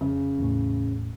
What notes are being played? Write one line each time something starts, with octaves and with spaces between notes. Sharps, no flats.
F2 C#3
E2 A2